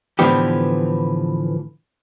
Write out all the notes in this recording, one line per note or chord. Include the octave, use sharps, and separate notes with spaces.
A2 D3 E3 F3 B3 G4